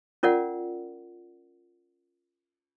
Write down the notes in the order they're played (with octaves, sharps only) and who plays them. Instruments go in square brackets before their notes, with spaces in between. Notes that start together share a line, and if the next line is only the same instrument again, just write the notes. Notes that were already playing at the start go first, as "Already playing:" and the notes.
[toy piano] C#4 F4 A#4 D5 F#5